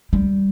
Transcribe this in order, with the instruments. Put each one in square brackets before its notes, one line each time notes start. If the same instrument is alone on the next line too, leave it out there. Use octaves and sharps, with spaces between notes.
[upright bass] G3